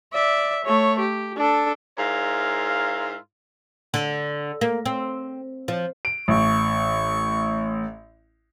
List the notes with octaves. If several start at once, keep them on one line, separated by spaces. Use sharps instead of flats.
D5 E5
A3 C#5
G4
D4 A4
G#2 E4 F4 A#4 C#5 F5
D3
A#3
C4
F3
D7
A1 C#6